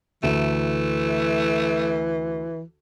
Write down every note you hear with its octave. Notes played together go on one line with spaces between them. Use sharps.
D2 E3 A3